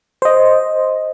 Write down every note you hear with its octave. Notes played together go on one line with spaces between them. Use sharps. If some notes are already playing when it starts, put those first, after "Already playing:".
C5 D#5